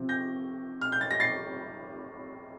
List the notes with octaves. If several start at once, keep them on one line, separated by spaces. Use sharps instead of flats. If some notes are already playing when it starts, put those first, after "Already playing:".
Already playing: C3 F3 C4
G6 A#6
F6
G6
A6
A#6
A6 C7